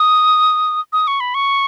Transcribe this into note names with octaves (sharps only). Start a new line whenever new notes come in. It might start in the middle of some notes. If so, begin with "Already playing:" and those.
Already playing: D#6
D#6
C#6
B5
C#6